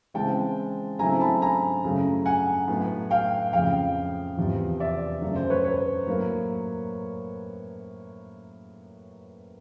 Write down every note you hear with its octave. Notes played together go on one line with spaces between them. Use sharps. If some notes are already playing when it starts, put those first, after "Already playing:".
C#3 E3 G#3 C4 G5 A5
C#3 F#3 A3 C4 E4 G#5 A#5
A5 B5
G#5 A#5
F#2 C#3 F#3 A3
F#5 G#5
A2 F#3 B3
F5 G5
F2 C#3 F3 F5 G5
E2 C3 F3
D5 E5
F#2 C#3 F#3 A3
C5
B4 C#5
B4 C#5
A2 F#3 A#3